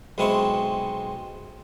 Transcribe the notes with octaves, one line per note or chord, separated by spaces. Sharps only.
B1 G#3 C4 E4 C#6